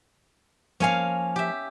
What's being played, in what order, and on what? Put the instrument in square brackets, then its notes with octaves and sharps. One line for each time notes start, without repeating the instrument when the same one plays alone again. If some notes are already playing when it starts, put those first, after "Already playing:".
[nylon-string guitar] F3 A#3 G#5 [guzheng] C#4 C#5 F5
[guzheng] G4 E5